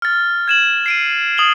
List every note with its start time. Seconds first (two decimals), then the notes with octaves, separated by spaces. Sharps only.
0.02 F6 A6
0.48 G#6 E7 F#7
0.86 C7 D7 D#7
1.38 D#6 F#7 G7